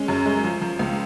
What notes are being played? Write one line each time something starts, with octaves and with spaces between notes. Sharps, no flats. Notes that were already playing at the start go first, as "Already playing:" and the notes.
Already playing: G#3 C#4
F#2
G#3
F3
F3
C#2